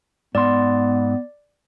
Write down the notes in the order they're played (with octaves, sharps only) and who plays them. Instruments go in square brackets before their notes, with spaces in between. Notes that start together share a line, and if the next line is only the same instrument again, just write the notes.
[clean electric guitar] G#2 C6 [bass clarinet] B3 [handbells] D5